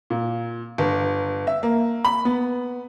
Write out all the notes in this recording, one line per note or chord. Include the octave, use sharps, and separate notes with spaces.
A#2
G1
E5
A#3
B5
B3